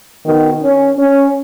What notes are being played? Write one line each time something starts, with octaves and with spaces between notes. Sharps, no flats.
B2 D#3
C#4
C#4